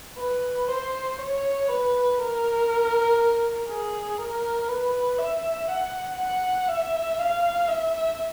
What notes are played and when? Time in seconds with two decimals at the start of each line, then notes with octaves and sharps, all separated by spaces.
0.18 B4
0.68 C5
1.18 C#5
1.68 B4
2.18 A#4
3.68 G#4
4.18 A#4
4.69 B4
5.18 E5
5.68 F#5
6.19 F#5
6.68 E5
7.19 F5
7.69 E5